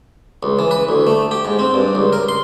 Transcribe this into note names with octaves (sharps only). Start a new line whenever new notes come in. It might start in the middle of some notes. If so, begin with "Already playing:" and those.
C#2
E3
B4
D2
A3
G4
G#2
C4
G2
C#2
A#4
C6